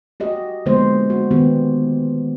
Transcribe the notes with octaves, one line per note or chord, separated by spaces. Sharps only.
F#4 G4 D#5
D3 F3 G#3 A#3 B3 C5
F#4
D#3 B3 G4